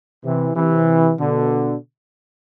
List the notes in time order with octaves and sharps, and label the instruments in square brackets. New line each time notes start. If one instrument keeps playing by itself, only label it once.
[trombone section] C3 E3
C3 E3
B2 D3